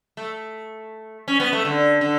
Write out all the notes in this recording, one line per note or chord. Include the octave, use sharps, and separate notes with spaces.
A3
C#4
B3
A3
D3
D3